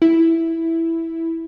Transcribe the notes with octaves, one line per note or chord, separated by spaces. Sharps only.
E4